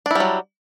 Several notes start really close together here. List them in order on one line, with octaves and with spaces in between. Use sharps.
D4 E4 G3 F#3